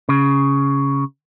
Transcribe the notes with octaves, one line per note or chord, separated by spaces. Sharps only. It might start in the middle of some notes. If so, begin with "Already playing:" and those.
C#3